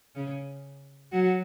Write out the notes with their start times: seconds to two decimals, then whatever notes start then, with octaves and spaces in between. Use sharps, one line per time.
0.15 C#3 C#4
1.12 F#3 F#4